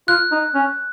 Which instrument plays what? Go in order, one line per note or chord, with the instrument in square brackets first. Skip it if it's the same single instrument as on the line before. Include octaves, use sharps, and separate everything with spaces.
[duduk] F4 [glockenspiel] F#6
[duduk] D#4
C#4